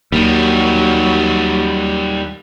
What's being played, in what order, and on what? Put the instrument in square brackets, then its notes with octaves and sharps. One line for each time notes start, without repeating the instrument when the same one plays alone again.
[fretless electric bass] D#2 [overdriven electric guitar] D#3 G3 [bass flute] F#3